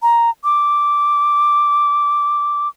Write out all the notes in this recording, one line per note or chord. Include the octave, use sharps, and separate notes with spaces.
A#5
D6